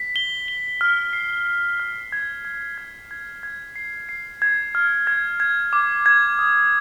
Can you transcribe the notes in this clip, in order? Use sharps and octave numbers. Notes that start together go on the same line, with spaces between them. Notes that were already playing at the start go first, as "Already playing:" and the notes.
Already playing: B6
G7
G7
F6
C7
C7
F6
G#6
G#6
G#6
G#6
G#6
C7
C7
G#6
F6
G#6
G#6
D6
G#6
D#6